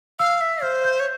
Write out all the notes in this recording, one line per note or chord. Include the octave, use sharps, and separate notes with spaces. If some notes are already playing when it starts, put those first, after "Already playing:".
F5 E6
E5
C5 F6
G6
C#5